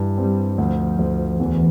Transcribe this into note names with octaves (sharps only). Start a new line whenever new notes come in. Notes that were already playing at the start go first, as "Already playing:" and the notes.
Already playing: G2 E3
G3 C4
D2 F3
D2
E2 E3